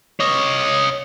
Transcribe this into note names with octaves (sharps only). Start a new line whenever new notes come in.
C#5 D#5